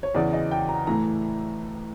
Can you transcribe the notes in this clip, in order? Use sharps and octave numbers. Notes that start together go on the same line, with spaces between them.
C#5
E2 C#3 E3 D5
D#5
G5
A#5
A2 E3 A3 A#5